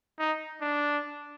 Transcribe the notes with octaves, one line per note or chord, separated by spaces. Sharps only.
D#4
D4